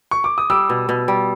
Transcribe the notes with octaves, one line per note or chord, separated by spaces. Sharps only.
C#6
D6
D#6
G3 D6 E6
B2
B2
G3